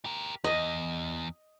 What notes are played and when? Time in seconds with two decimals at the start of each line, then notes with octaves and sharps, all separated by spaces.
0.05 G4 A#4
0.44 E2 D#5